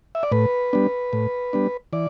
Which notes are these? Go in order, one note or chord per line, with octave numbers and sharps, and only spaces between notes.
E5
D5
A2 B4
G3 B3 D4
A2
G3 B3 D4
E3 D5